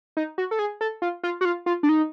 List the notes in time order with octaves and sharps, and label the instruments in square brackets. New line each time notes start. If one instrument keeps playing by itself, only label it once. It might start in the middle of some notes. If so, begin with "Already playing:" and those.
[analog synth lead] D#4
F#4
A4
G#4
A4
F4
F4
F#4
F4
F4
D4
D#4